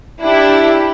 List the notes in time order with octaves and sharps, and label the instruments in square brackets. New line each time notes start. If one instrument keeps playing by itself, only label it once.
[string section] D4 E4 G4